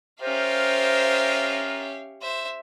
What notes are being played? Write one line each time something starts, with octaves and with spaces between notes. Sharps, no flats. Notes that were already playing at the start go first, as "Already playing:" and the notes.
C#4 F4 G4 A#4 C5 E5 F5
C5 E5